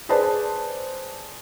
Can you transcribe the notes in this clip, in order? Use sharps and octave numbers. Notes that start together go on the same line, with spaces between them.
G#4 B4 C5 D5 A5